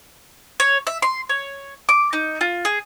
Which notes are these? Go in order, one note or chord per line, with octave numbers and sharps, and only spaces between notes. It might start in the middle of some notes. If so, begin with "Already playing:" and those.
C#5
E5
C6
C#5
D6
D#4
F4
G#4